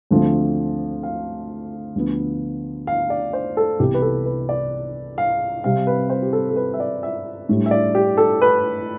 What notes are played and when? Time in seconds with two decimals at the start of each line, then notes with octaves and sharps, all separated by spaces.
0.11 D2 D3 F3 A3 C4
1.03 F5
1.96 D2 D3 F3 B3
2.87 F5
3.10 D5
3.33 C5
3.57 A4
3.79 C2 C3 E3 B3 E4 G4
3.94 B4
4.02 A4
4.26 B4
4.49 D5
5.18 F5
5.64 C3 G3 C4 F5
5.87 B4
6.10 C5
6.22 G4
6.33 A4
6.50 A4
6.56 B4
6.74 E5
6.80 D5
7.03 E5
7.49 A2 G3 D4
7.66 E5
7.71 D5
7.95 G4
8.17 A4
8.42 B4